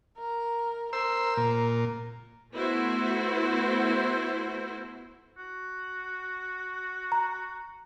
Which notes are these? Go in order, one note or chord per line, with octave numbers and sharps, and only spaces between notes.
A#4
A#4 C5 E6
A#2
A3 B3 E4 F#4 C5
F#4
A#5